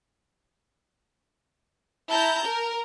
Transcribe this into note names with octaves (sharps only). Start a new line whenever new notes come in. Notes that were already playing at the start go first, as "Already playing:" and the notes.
E4 A5 A#5 G6
A#4